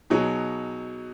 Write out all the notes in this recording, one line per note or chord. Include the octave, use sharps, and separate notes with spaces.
B2 F#3 D#4 G#4